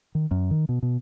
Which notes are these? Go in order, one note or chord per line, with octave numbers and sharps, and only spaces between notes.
D#3
F#2
D#3
B2
B2